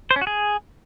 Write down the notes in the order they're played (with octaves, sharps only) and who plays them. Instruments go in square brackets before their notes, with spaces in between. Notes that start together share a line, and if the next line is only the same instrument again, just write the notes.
[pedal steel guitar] C5
C#4
F#4
G#4